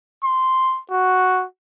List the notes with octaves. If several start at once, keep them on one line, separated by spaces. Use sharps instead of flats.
C6
F#4